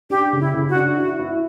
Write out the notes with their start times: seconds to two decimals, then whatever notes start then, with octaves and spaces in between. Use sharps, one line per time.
0.10 D4 G4
0.33 C#3
0.40 E4
0.54 C#3
0.69 F#4
0.75 D4
0.97 E4 F#4
1.20 E4